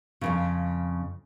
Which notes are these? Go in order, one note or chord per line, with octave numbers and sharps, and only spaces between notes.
F2 G#2 C#3